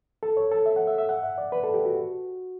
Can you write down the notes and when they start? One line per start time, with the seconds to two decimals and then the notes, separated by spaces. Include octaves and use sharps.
0.23 A4
0.37 C#5
0.52 A4
0.66 E5
0.76 F#5
0.87 E5
0.98 E5
1.09 F#5
1.23 E5
1.38 D5
1.52 B4
1.64 A4
1.74 G4
1.85 F#4